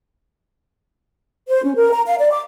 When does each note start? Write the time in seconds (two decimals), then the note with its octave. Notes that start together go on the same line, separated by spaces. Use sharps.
1.49 C5
1.64 C#4
1.76 A#4
1.92 A#5
2.07 F5
2.19 D5
2.32 D6